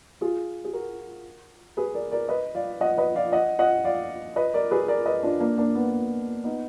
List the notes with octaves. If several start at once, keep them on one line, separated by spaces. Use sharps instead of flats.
F4 G#4
G#4
F#4 A#4
G#4 B4
A#4 D5
A#4 D5
B4 D#5
D5 F5
D#5 F#5
B4 D#5
D5 F5
D#5 F#5
D#5 F#5
D5 F5
B4 D#5
A#4 D5
G#4 B4
A#4 D5
B4 D#5
D4 F4
A#3 D4
A#3 D4
B3
B3 D#4